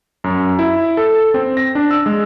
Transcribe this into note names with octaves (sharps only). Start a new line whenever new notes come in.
F#2
E4
A4
C4
A#6
D4
E6
G#3